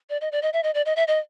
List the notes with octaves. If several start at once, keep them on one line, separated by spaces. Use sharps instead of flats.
D5
D#5
D5
D#5
E5
D#5
D5
D#5
E5
D#5